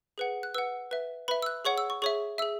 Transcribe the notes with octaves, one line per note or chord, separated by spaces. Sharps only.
G#4 B4 F#5
F#6
B4 F#5 E6
B4 E5
B4 E5 B5
E6
F#6
G#4 C#5 F#5 C#6
E6
C#6
G#4 C#5 E5 C#6
G#4 E5 E6